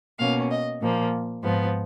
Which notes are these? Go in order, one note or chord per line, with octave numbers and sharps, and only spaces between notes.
B2 A#3 C#4 F5
D#5
A#2 F3 A#3
G#2 F3 B3